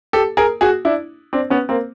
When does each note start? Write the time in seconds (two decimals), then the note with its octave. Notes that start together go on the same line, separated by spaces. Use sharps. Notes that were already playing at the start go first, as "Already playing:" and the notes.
0.13 G4 A4
0.37 G#4 A#4
0.61 F#4 G#4
0.85 D4 E4
1.33 C4 D4
1.50 B3 C#4
1.69 A#3 C4